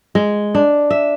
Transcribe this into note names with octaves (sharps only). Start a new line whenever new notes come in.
G#3
D4
E5